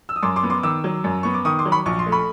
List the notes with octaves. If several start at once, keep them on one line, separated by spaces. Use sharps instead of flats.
E6
D#6
F#2 C6 D6
C6 D6
B3
C6 D6
D#3 D6 E6
F#3
F#2
B3 C#6
D6
D#3 C#6 D#6
C6 D6
F#3
B5 C#6
A#1 C#6
C6
A3
B5 C#6